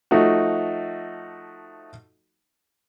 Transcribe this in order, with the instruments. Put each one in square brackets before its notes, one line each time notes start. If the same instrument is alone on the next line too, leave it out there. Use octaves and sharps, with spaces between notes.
[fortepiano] F3 A3 D#4 F#4